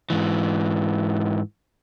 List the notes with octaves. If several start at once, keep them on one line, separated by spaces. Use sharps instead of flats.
G#2 E3